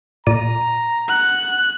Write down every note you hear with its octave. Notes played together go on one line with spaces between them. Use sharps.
A#2 D5 A#5 D#7
F#5 F#6